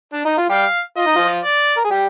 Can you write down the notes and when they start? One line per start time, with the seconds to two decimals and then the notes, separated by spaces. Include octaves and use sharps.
0.14 D4
0.25 D#4
0.38 F4
0.49 G3 G4 F5
0.97 F4 D#5
1.07 D#4
1.16 F3 F4
1.44 D5
1.77 A#4
1.84 G#4
1.91 G3 G4